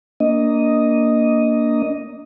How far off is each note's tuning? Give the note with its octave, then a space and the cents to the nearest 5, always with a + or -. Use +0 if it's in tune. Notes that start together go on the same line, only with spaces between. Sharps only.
A#3 +0 D4 -20 D#5 +0